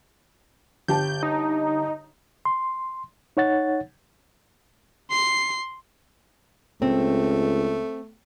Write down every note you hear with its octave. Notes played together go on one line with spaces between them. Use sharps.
G1 G4 A5 G6
D#4
C6
D#4 C#5 F#5 A6
C6 C7
C#2 A3 C4